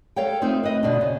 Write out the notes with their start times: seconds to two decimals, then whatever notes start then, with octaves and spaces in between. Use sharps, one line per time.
0.16 A4 C#5 F5 G5
0.42 A3 C4 D#4 F4 C5
0.63 B4 D#5
0.83 D2 B2 D4
1.01 C#3